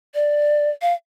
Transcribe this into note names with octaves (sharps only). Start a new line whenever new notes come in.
D5
F5